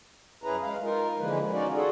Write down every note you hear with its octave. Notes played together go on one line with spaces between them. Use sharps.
F#2 C#4 E4 G#4 B4 A#5
G#3 F5
D#4 F4 A#4
D3 E3 F3 G#3 A#3 B4
C#4 D#4 F4 F#4 D5
F4 F#4 G#4 A4